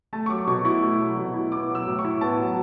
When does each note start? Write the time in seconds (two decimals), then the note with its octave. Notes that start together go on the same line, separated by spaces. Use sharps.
0.13 A3 A5
0.26 C#6
0.30 F#3 D6
0.47 B2 C#6
0.65 E4 C#6
0.82 A3
1.00 F#3
1.17 B2
1.34 E4
1.52 B3 D6
1.69 F#3
1.75 E6
1.87 A2
1.99 C#6
2.05 E4
2.21 B3 A5
2.39 F#3